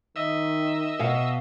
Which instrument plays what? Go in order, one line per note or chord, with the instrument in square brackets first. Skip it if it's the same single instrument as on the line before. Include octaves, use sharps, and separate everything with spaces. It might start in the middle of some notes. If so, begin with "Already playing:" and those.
[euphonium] D#3 [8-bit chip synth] D#5 E5 E6
[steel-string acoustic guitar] B2 F5